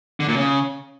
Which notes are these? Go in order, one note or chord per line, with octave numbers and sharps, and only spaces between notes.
D3
A#2
C#3